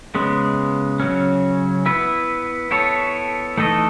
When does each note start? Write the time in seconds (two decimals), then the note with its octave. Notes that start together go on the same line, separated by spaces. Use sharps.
0.15 C#3 G#3 B3
1.00 C#3 F#3 C#4
1.86 B3 E4 B4
2.71 B3 E4 A4 C#5
3.58 E3 A3 D#4 A4 D#5